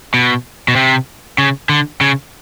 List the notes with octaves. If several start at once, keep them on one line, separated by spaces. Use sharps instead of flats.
B2
B2
C3
C#3
D3
C#3